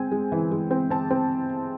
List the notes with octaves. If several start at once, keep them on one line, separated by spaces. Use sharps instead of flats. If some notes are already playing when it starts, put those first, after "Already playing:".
Already playing: G#3 C4 G#5
G#3
E3
G#3
C4
C4 A5
C4